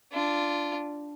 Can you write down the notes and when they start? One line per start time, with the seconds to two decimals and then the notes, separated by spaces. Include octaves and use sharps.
0.12 D4 F4